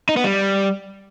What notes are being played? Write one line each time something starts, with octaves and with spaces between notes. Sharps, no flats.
D#4
B3
G3